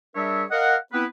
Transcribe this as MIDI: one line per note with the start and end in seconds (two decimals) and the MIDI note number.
0.16 0.44 55
0.16 0.44 62
0.16 0.44 68
0.16 0.44 70
0.16 0.44 73
0.16 0.44 76
0.51 0.76 70
0.51 0.76 75
0.51 0.76 77
0.51 0.76 78
0.92 1.05 59
0.92 1.05 60
0.92 1.05 64
0.92 1.05 71